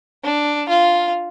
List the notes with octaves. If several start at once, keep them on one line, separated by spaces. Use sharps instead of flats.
D4
F4